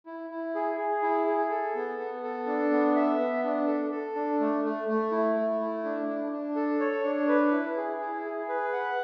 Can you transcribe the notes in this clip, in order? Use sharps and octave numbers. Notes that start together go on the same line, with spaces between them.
E4
E4
G#4
G#4
E4
G#4
A4
B3
B3
A4
D4
B3
E5
B3
D4
A4
A4
D4
A3
A3
A3
E4
A3
E4
D4
D4
D4
A4
C#5
D4
B4
E4
G#4
E4
G#4
B4
F#5